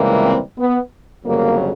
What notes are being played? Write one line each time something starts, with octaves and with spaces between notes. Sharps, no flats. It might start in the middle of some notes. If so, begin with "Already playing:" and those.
Already playing: C#2 C3 E3 G3 A#3
C4
B3
G1 F2 C#3 F#3 A#3